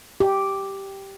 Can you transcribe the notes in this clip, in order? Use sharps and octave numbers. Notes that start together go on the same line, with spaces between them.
G4